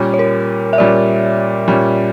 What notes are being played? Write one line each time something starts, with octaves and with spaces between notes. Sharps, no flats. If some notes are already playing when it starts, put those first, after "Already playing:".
Already playing: A#2 G3 C#4
C#5
A#4
E5
A#2 G3 C#4 D5
A#2 G3 C#4